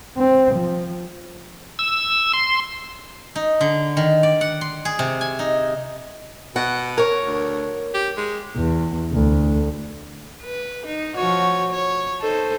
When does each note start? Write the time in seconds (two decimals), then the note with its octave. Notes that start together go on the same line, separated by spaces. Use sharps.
0.17 C4
0.55 F3
1.79 E6
2.34 C6
3.36 D#4
3.61 D3
3.97 D#3
4.23 D5
4.41 F#5
4.61 C6
4.85 G#4
4.99 C3
5.21 G#5
5.39 D#4
6.56 B2 F#5
6.98 A#4 C#5
7.24 D2
7.94 G4
8.17 G#3
8.57 E2
9.13 D2
10.43 B4
10.86 D#4
11.16 F3 F#4 C#5
11.72 C#5
12.21 D#4 A4 C5